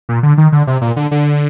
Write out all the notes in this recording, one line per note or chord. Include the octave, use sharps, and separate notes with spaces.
A#2
D3
D#3
D3
C3
A#2
D3
D3